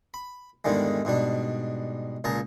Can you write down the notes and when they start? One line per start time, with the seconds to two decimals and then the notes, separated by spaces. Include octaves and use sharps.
0.14 B5
0.65 E2 G#2 D3 D#3 G3 G#3
1.05 G#2 B2 G3 D4
2.24 C#2 A#2 G#4 A5 A#5